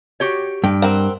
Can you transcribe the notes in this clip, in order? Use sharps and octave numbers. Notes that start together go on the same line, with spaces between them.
F#4 G4 C#5
G2 G5
C4 A#4 F#5